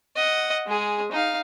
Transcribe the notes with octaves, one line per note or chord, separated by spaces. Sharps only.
D#5 F#5
G#3 G#4
D#4 F5